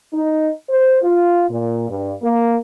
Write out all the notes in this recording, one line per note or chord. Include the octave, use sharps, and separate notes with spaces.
D#4
C5
F4
A#2
G2
A#3